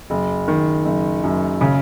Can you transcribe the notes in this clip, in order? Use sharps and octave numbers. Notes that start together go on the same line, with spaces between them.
F#1
D#3
F#1
F#2
C#3